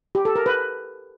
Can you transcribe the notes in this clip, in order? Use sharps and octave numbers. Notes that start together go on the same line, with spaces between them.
G4
A4
A#4
B4